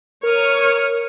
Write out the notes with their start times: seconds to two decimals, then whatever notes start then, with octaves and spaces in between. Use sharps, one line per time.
0.23 A#4 C#5 D#6 F6